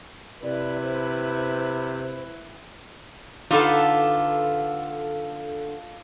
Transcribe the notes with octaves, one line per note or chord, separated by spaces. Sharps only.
C3 E4 B4 D5
C5
D3 D#4 F4 G4 A4 B4